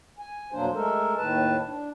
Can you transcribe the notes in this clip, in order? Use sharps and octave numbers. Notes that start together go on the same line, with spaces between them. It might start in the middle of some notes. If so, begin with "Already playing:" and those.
G#5
F2 B2 F#3 A#3 D4 C5
G#3 A3 A4 A#4
D#2 A2 D#3 B4 A5
D4